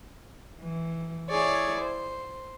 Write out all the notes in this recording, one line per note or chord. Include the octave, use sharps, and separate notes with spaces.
E3
E4 G#4 C#5 D5
C5